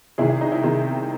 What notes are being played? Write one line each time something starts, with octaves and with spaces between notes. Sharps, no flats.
C2 C3 D#3 E4 G#4
E4
D#4
E4
C2 C3 D#3